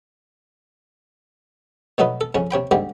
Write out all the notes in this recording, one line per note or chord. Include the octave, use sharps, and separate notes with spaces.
B2 F#3 A3 D#4 B4
A4
F2 C#3 C#4
C3 C#5 G5 B5
G#2 D3 G3 C4 G4